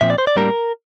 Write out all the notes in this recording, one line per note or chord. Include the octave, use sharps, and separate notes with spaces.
A#2 F3 C4 E5
D5
C5
D5
A2 G3 A#3 D4 A#4